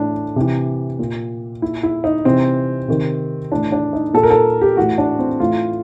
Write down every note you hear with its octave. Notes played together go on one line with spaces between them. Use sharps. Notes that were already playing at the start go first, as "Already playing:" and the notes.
Already playing: A2 E3 D4
C3 E3
A#2
A#2 E4
E4
D#4
C3 E3 C4
C3 D#3
A2 E3 D4
D4
D#4
A#2 A4
A#4
A4
G4
A2 E3 F#4
D4
C4
A2 E3 F4